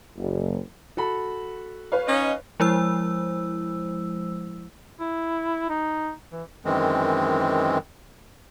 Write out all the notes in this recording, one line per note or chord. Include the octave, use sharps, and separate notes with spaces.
F#1
F#4 A4 B5
B4 C#5 F5
C#4 D#4 D#5
F3 G#3 E4 C5 E6
E4
D#4
E3
F#2 D#3 E3 G#3 C4